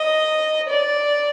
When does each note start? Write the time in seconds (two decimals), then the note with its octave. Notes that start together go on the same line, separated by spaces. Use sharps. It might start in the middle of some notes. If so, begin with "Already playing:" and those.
Already playing: D#5
0.69 D5